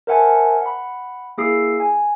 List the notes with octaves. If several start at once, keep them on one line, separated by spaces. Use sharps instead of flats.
A#4 C5 E5 F#5 G#5 A5
F#5 B5
A#3 E4 G#4 D#6 E6 C7
G#5